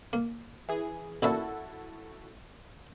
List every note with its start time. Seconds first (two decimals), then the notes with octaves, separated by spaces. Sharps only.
0.13 A#3
0.69 E3 G#4
1.22 A1 A#2 E4 F#4 A4 E5